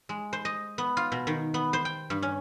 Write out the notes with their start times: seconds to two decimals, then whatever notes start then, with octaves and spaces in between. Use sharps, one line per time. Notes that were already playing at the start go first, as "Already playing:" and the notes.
0.09 G#3
0.33 C5
0.45 D#5
0.78 B3
0.97 F4
1.12 B2
1.27 D#3
1.54 B3
1.73 C5
1.85 G5
2.10 G2
2.22 C#4